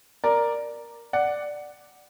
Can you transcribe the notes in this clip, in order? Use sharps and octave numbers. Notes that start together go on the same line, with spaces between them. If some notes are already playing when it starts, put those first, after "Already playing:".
A#4 D5
D5 F#5